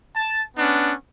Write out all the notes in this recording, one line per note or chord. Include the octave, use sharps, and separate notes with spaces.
A5
B3 C#4 D4